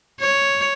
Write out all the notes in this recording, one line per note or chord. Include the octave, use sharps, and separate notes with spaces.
C#5